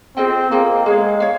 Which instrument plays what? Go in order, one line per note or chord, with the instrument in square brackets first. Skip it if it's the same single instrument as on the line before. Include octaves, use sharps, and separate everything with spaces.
[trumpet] C4 [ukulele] F4 G#4 D#5 G5
[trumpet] A#3 [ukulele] F4 G#4 D#5 G5
[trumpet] G#3 [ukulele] G#4 C#5 F5
[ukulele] C#5 F5